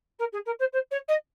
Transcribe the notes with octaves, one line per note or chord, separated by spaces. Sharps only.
A#4
G#4
A#4
C5
C5
C#5
D#5